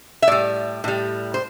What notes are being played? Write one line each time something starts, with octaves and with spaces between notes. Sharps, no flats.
E5
A2 G3 D5
A2 G3
C5